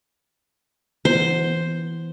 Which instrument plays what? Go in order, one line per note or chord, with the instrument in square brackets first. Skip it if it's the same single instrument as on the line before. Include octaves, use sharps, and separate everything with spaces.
[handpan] E3 B3 [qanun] C5